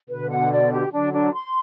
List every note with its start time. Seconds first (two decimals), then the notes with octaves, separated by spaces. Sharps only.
0.09 B2 D3 B4
0.30 F#5
0.51 D5
0.71 G4
0.92 D3 F#3 D4
1.13 D4
1.33 C6